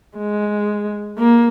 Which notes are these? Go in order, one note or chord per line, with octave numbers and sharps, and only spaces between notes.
G#3
A#3